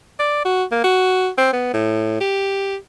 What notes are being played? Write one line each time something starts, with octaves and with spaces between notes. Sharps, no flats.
D5
F#4
A#3
F#4
C4
B3
A2
G4